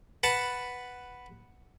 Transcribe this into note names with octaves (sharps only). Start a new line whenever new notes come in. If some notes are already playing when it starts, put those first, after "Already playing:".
B4 F#5 A5